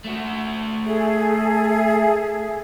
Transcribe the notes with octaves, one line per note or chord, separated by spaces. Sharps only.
A3 F#4
G#4 A4 E5